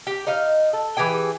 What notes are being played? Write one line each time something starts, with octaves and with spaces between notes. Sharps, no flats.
G4
D#4 D#5 F5
A4
E3 G4 G#4 G5